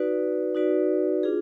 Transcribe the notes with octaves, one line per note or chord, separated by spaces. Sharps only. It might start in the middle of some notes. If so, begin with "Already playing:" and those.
Already playing: D#4 F#4 B4 D5
D#4 F#4 B4 D5
D4 F4 G#4